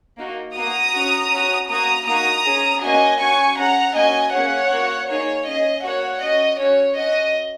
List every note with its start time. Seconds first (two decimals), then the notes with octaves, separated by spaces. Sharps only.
0.18 A#3 D#4 F#4
0.56 A#3 F#4 A#5 D#6
0.94 C#4 F#4
1.31 C#4 F#4
1.69 A#3 F#4 A#5 D#6
2.07 A#3 D#4 F#4 A#5 D#6
2.45 C#4 G#4
2.82 A#3 C#4 F#4 D#5 G#5
3.20 C#4 F#4 G#5 C#6
3.58 C#4 G#4 F#5 A#5
3.95 A#3 C#4 F#4 D#5 G#5
4.33 A#3 C#4 G#4 C#5 F#5
4.71 A#3 F#4
5.08 A#3 D#4 G#4 C#5
5.46 C#4 G#4 D#5
5.84 A#3 F#4 C#5 F#5
6.22 C#4 F#4 D#5
6.59 C#4 F#4 C#5
6.97 C#4 F#4 D#5